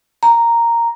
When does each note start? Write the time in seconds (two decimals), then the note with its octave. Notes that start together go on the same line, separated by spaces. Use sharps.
0.23 A#5